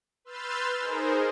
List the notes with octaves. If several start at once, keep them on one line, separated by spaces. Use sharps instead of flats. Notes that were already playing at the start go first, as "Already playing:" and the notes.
B4 C6 E6 F6 G6 A6
D#4 G#4 A#4 C5